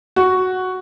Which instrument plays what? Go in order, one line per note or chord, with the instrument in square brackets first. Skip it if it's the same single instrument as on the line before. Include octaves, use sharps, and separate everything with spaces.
[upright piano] F#4